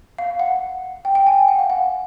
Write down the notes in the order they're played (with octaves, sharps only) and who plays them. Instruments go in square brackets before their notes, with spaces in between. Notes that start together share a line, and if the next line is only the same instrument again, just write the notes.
[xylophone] F5
F#5
G5
G5
G#5
G5
F#5
F5
F#5